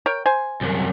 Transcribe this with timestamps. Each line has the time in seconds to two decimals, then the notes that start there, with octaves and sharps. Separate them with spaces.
0.06 A#4 C#5 G5
0.26 C5 G#5
0.61 C2 F#2